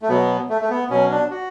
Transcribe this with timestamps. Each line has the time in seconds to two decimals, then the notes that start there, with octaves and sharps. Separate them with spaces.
0.02 A3
0.09 B2 F#3 B3
0.49 A3
0.61 A3
0.70 B3
0.90 B2 F#3 C#4
1.10 D4
1.31 F#4